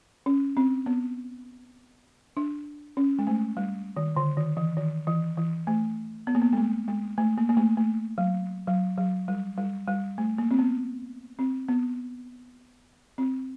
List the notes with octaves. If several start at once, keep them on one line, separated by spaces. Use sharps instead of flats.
C#4
C4
B3
D4
C#4
G#3
A3
G3
D#3
D3
D#3
E3
D#3
E3
E3
A3
B3
A#3
B3
G#3
A3
G#3
A3
A#3
A#3
A3
A3
F#3
F#3
F#3
G3
G3
G3
A3
A#3
C4
B3
C4
B3
C4